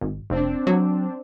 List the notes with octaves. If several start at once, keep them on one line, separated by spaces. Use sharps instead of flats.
G#1
F1 C4 D4
F#3